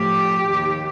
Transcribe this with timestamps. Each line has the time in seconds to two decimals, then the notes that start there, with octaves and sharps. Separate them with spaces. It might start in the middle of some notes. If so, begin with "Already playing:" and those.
Already playing: A2 F3 G4
0.46 D#2 D#3